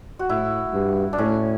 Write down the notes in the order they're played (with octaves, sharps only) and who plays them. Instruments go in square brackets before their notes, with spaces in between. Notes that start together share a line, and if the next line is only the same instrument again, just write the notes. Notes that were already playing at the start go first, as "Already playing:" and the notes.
[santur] F#4
[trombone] A2 [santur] E4
[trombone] G2
[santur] D4
[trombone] A2 [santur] C#4